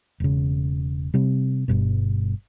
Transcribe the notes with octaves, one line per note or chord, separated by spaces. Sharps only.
E1 C#3
C3 G3 C4
G1 G2 B2